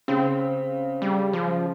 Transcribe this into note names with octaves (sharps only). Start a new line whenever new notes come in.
C#3 C4
G3
F3